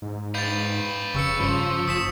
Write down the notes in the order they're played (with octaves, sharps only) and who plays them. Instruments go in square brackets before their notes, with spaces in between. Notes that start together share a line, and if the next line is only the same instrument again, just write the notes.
[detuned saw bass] G#2
[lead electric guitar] B4 F5 [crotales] G6 A6
[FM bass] F1 [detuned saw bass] C#3 [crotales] C#6 E6 C#7
[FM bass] G2 [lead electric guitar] F3
[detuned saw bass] F#1 [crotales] D#6 B6 E7